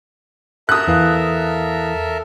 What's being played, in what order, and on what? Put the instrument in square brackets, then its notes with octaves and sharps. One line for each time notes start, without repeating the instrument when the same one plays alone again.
[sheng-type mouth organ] A4 A#4 E5 [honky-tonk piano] D#6 F#6
[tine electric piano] E2 E3 F5